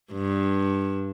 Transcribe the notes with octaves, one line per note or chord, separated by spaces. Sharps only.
G2